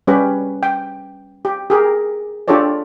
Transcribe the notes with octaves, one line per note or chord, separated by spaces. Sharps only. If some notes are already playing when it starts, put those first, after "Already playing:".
G3 C#4 G4 B4
G5
G4
G4 G#4 A#4
D4 F4 G4 A4 C#5 D5